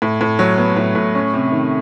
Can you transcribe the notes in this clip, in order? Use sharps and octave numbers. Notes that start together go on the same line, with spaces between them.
A2
A2
F#3
B3
A2
A2
C#4
C3
D#3